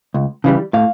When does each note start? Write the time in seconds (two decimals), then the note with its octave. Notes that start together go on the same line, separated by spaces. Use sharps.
0.14 C#2
0.44 C#3 E3 G3
0.73 A2 F5